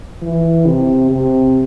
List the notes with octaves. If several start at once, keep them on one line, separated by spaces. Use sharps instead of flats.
E3
C3
C3